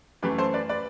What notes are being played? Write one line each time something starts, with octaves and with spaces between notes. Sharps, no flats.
F#2 E3 A3 G4 B4
A4 C5
B4 D5
B4 D5